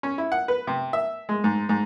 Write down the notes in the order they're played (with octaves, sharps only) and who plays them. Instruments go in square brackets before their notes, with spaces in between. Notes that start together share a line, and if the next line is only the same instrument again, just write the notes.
[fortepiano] C#4
E4
F#5
B4
C3
E5
G#3
G#2
G#2